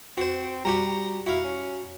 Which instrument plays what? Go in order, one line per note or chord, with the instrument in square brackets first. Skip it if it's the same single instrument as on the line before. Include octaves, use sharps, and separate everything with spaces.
[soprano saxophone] C4 [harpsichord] F#4 C5
[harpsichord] G3 F#4 G4 [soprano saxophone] A#5
[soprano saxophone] E4 [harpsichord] F#4 F5
[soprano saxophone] C#4